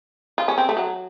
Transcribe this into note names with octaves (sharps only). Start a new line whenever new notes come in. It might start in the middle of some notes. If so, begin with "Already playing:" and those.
F4
C#4
C4
A3
F#3